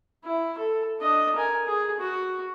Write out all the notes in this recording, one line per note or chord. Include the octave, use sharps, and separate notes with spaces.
E4
A4
D4 D#5
A#4 G#5
G#4
F#4